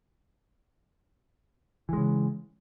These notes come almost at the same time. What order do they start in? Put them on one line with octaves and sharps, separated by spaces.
E3 G#3 C#3